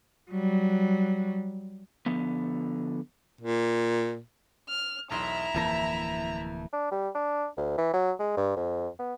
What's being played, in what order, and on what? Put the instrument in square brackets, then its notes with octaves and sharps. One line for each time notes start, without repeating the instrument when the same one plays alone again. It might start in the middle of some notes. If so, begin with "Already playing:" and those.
[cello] F#3 G3
[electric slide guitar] D3 F3 B3
[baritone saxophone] A#2
[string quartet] F6
[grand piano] E1 B1 C6 [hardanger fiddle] E4 E5 [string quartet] A#5
[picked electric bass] D1 E3 A#3 [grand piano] F2 A5 A#6
[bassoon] D4
G3
D4
D2
E3
F#3
G#3
G2
F2
B3